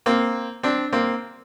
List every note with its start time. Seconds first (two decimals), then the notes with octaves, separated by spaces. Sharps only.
0.06 A#3 C4
0.63 C4 D4
0.93 A#3 C4